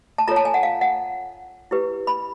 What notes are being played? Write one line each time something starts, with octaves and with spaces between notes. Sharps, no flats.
A5
F4 A4 C#5 A#5
A5
G#5
F#5
F5
F#5
E4 G4 B4
B5